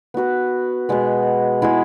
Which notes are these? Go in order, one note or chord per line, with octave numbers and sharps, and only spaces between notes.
B3 F#4 B4
B2 G#3 B3
G#3 B3 E4 G#4